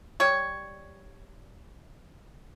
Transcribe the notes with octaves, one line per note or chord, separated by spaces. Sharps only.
G3 C#5